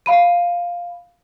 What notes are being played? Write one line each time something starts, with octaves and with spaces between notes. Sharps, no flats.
F5 B5 D#7